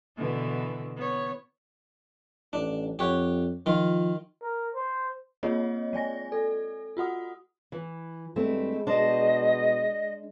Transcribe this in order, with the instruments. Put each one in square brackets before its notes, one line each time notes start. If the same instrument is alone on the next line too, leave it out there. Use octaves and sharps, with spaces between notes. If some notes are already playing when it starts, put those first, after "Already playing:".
[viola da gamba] B2 D3 E3
B3 C#5
[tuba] A1 [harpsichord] D4
[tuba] F2 [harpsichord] G4 C#5 F#5
[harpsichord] D#3 F4 [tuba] F3
[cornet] A#4
C5
[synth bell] A#3 C4 F4 G#4 C#5 D#5
G#3 D5 G#5 A#6
A4
F4 F#4 F#5 D#6
[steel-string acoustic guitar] E3
[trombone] G2 [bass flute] G#3 [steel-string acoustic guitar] A3 C4 E4
[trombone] B2 [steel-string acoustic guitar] D4 C5 [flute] D#5